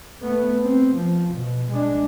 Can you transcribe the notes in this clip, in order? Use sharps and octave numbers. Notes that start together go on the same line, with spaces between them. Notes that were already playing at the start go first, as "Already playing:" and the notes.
A3 B3
C4
F3
B2
G#3 D4